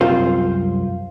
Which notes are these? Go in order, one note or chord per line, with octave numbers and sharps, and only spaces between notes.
C2 F#2 C4 F4 C5